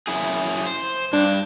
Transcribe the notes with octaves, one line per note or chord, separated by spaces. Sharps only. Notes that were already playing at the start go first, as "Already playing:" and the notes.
F#2 E4 G#4
C5
G2 D4